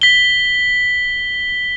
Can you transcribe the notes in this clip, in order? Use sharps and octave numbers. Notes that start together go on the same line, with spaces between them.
B6 G7